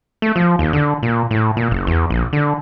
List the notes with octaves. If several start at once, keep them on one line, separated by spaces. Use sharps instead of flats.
A3
F3
D#2
D3
A#2
A2
A#2
F#1
E2
A#1
D3